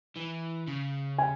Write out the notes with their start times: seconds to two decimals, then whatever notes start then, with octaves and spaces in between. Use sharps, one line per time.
0.16 E3
0.67 C#3
1.18 G#5